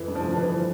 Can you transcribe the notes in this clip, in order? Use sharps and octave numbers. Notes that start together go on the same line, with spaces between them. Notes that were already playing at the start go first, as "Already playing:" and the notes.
Already playing: F2 E3
G2
F3
G2
F3
E3
E3